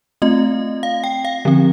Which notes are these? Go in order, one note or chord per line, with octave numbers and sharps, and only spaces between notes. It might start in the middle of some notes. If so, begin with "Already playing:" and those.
A3 C4 F4 D#5
F5
G5
F5
D3 F3 C4